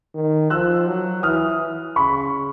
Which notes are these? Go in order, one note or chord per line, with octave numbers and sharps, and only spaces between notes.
D#3
F3 E6 F#6
F#3
E3 D#6 F6
C#3 B5 C#6